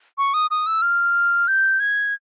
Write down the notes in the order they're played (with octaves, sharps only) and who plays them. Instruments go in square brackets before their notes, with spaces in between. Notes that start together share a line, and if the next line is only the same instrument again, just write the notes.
[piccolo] C#6
D#6
D#6
E6
F6
G6
G#6